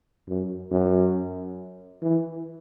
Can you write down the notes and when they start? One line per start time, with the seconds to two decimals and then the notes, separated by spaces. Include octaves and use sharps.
0.28 F#2
0.71 F#2
2.02 E3